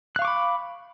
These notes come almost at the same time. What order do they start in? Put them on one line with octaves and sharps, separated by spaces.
F#6 F5 C#6 D6 B5